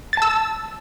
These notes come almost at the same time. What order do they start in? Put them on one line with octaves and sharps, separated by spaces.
A6 A5 E6